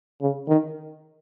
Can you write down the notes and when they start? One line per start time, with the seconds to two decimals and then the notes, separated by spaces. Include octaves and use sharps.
0.21 C#3
0.48 D#3